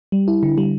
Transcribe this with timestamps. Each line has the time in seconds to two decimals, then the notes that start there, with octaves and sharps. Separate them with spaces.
0.12 G3
0.28 E4
0.43 D3
0.58 G3